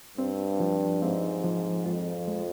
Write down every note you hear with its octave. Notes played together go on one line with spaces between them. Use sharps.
G2 C4
F3
G#2 C4
F3
F2 F4
G#3